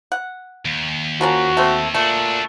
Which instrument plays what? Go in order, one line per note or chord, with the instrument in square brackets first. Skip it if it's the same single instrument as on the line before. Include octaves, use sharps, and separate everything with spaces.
[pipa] F#5
[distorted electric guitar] D#2
[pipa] F3 A#3 C#4 [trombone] F#4
[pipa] A3 C4
[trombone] A#2 [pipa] A3 [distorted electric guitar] D4 F#4